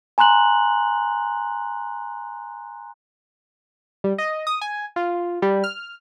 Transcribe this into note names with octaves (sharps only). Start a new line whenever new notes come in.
G#5 A#5 C6 F#6 F#7
G3
D#5
D#6
G#5
F4
G3
F6